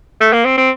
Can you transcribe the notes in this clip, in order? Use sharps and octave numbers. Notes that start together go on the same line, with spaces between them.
A3
A#3
C4
C4